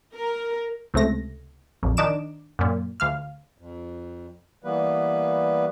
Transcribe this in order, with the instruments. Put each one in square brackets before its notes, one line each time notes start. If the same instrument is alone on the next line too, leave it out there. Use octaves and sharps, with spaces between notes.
[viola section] A#4
[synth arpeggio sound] C#2 C3 A3 A#6
A#1 F2
D#3 D4 D#4 D6 D7 E7
F#2 A#2
D2 F5 F6
[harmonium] F2
E3 G3 A#3 B3 B4